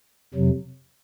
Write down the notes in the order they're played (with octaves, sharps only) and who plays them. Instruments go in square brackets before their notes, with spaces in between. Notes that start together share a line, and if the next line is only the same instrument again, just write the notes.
[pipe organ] F2 C3 F#3